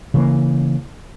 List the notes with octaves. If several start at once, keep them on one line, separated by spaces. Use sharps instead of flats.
C#3 E3 A#3